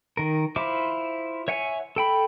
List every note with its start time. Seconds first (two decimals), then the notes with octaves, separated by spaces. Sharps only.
0.17 D#3 A#4
0.56 E4 F4 C5 E5 D6
1.48 C#5 E5 F#5 G#5
1.96 A4 G5 B5